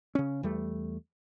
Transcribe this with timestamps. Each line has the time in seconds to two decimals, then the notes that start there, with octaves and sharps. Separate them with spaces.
0.15 C#3 C#4
0.43 E2 G3 A3